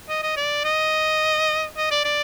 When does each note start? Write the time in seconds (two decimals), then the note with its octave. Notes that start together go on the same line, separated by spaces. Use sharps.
0.09 D#5
0.23 D#5
0.37 D5
0.64 D#5
1.77 D#5
1.91 D5
2.05 D5